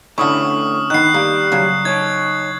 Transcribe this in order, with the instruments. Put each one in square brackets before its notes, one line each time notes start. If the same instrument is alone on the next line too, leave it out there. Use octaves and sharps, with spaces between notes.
[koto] D3 E4 [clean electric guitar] A3 C#4 F#4 [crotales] C#6 D#6 F6
[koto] D#3 B3 [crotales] F#6 C7
[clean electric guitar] G3 [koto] A#3
[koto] C#3 F#3 C5
[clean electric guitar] D#4 C#5 [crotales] G#6